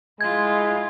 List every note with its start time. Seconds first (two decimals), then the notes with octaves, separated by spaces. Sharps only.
0.21 G#3 E4 F4 G#6